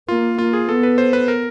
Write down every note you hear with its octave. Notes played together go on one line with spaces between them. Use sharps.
A#3 F4
A#3 F4
G#4
B3 A4
B4
C5
B4
A#4